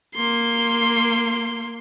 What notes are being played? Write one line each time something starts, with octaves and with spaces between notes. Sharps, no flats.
A#3 C6